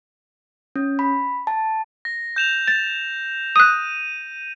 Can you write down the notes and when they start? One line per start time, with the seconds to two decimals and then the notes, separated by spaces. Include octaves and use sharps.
0.76 C#4
0.99 B5
1.47 A5
2.05 A#6
2.36 G6 E7 F7
2.68 A6
3.56 D#6 F#6 D#7